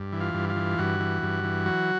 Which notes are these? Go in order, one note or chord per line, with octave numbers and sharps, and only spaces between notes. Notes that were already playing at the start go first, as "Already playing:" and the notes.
Already playing: G2
E3
F4
G2
F4
E3
G2 F#4
E3
G2
E3
F#3